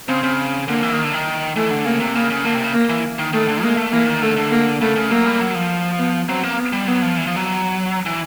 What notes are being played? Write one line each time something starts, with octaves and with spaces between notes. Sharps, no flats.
C#3 C4
C#3
D3 A#3
E3
D#3
D3
D#3
E3 A3
D3
C#3 A#3
C3
C#3 A#3
C#3
D3 A#3
C3
C#3
A#3
E3
D#3
D#3 A3
D3
G#3 A#3
A3
E3 A#3
D#3
D3 A3
D3
A#3
C#3 A3
C#3
F#3 A#3
G3
F#3
F3
B3
F#3 C4
A#3
B3
G3
F#3 B3
F3
E3
F3
F#3
E3